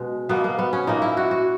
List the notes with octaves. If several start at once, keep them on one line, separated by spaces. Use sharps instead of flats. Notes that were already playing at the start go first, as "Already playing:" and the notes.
Already playing: B2 G#3 C#4
B2 A#3 B3
A#3
B3
C#4
A#2 A#3 D#4
E4
F#4
F#4